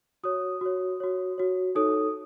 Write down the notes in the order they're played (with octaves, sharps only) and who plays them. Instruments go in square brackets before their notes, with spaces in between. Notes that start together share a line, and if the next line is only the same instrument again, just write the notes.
[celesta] F#4 C#5 D#6
F#4 C#5
F#4 C#5
F#4 C#5
D#4 A4 C#5 D#6